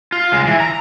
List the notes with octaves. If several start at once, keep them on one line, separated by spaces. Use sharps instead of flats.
F4
C#2 G#3
E3
A#5